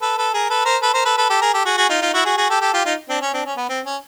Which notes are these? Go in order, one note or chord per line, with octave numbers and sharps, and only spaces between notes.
A4 B4
A4 B4
G#4 A#4
A4 B4
A#4 C5
A4 B4
A#4 C5
A4 B4
A4 B4
G4 A4
G#4 A#4
G4 A4
F#4 G#4
F#4 G#4
D#4 F4
D#4 F4
E4 F#4
F#4 G#4
F#4 G#4
G4 A4
G4 A4
F4 G4
D#4 F4
C4 D4
C#4
C4 D4
C#4
B3
C4
C#4